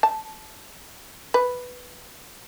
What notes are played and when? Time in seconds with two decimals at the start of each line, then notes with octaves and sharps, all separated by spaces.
0.03 A5
1.34 B4